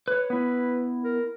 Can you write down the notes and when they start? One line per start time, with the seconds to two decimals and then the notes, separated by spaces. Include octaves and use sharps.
0.08 B4 C#5
0.30 B3 E4 B4
1.04 A#4